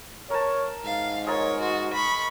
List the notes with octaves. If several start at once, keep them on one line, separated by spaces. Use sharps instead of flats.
A#4 C#5 A5
G#2 F5
G#3 F4 A#4 C#5
F#4
B5 C#6